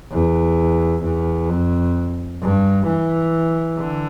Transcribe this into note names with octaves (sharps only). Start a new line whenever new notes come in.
E2
E2
F2
G2
E3
D3